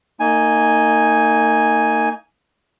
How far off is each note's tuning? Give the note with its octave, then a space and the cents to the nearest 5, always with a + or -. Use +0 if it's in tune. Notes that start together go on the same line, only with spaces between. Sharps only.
A#3 -35 D#4 +0 G#5 +0